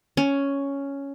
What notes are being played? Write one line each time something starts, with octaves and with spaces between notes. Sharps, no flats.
C#4